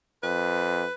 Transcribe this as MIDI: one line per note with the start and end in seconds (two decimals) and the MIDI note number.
0.23 0.84 41
0.23 0.93 71